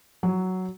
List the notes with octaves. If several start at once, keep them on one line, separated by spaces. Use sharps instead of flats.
F#3